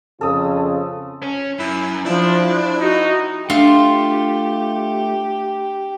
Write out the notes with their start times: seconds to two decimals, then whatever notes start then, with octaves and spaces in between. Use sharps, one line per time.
0.21 F2 C#3 F4 A4 D#6 E6
1.23 C#4
1.59 F#2 E4
2.06 F3 D4 E4
2.81 D#4 F#4
3.50 A3 D4 F4 G4